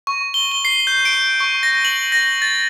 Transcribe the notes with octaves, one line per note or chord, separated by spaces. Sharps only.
C#6
G7
G7
C7
G6
D7
C#6
A#6
F#7
A#6
A6